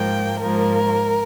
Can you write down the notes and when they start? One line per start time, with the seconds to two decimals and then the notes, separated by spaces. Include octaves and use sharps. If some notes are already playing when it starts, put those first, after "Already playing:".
Already playing: G#2 F3 A#3 G5
0.41 G#2 F3 A#3 A#4